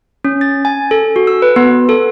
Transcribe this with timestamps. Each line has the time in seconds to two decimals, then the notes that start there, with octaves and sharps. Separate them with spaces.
0.24 C#4
0.41 A6
0.65 G#5
0.91 A4
1.16 F#4
1.27 E6
1.42 B4
1.56 B3
1.89 A4